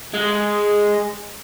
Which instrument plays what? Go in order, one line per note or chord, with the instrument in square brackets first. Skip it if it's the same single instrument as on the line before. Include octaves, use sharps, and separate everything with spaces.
[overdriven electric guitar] G#3